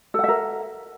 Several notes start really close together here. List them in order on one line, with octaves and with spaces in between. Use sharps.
A4 F#5 E5 A#4